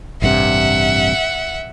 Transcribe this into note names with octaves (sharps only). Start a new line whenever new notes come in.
A1 G2 C3 E5 F#5